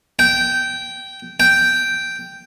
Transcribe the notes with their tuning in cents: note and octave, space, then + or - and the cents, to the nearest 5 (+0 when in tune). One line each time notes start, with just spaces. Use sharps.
G5 -15
G5 -5